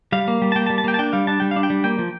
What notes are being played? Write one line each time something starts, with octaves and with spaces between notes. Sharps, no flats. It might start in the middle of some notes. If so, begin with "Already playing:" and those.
G3 F5
A#3
G3
A5
A#3 G5
A5
G3
A5
A#3 G5
A5
D4 G5
G3 F5
D4 A5
G3 G5
F5
D4
G5
G3
A#3 G5
F3